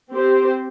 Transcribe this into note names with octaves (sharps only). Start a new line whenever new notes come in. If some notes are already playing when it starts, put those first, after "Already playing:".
C4 G4 C5